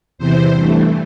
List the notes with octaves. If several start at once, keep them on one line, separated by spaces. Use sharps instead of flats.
E2 C3 E3 C5
G2 E3 A3